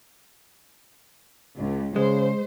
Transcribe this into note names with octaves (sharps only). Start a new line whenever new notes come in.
C#2
C#3 G#3 C5